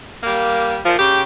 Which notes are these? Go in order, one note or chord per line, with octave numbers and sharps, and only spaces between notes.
G3 A#3
A#2 F3
C#3 G4